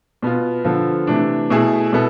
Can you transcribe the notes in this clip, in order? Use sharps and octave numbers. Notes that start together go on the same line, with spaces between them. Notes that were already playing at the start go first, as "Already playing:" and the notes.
B2 B3 F4
D3 F3 B3 F4 A4
C3 E3 A3 D4
B2 A3 E4 G#4
B2 B3 E4 A4